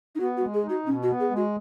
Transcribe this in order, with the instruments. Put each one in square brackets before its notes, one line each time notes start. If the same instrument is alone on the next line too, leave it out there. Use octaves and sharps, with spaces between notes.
[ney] D#4
[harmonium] B3 [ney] F#4
[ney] F#4
[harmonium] G#3
[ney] G#4
[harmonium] D#4
[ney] F#4
[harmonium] B2 [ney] C#4
[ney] F#4
[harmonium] B3
[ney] G#4
[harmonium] G#3
[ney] F#4